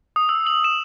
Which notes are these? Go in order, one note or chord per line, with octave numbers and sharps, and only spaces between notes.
D#6
E6
F#7
E7